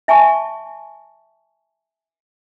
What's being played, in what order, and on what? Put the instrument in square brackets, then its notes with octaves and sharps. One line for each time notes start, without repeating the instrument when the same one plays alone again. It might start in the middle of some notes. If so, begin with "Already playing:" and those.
[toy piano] E5 G#5 A5 C#6